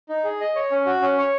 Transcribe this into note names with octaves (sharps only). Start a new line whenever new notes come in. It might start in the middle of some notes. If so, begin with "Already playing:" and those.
D#4
G#4
D#5
C#5
C#4
F#4
C#4
C#5